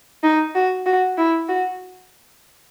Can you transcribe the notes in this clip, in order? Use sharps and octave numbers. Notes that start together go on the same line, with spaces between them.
D#4
F#4
F#4
E4
F#4